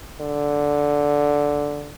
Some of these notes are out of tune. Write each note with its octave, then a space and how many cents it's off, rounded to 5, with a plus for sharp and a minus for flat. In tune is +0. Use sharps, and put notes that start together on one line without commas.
D3 -5